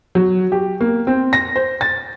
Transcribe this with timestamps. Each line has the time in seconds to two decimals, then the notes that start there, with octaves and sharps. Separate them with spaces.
0.15 F#3
0.52 G4
0.81 A#3
1.07 C4
1.33 A#6
1.56 C5
1.81 A6